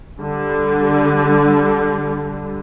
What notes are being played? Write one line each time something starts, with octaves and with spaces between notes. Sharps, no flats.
D3 G3